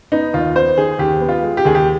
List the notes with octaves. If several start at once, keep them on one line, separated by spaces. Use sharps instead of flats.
B3 D#4
D#2 F4
B3 C5
D#3 G#4
D#2 G4
B3
F4
G#3
G4
D#2 G#4
G4